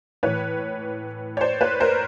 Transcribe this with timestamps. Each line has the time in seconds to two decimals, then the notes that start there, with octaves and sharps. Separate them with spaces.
0.23 A2 E3 B4 C#5
1.37 C#5
1.41 C5 D5
1.61 B4 C#5
1.80 A#4 C5